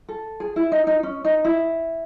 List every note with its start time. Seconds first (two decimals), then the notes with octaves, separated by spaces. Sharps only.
0.09 A4
0.40 G#4
0.56 E4
0.72 D#4
0.87 D#4
1.03 C#4
1.25 D#4
1.44 E4